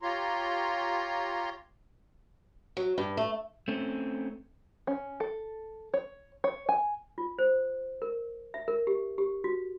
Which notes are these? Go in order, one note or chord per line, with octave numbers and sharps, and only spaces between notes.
F4 G4 C#5 A#5 C6
F#3
G2
A3
A3 C4 C#4
C#4
A4
C#5
C#5
G#5
F4
C5
A#4
E5
A#4
G4
G4
F#4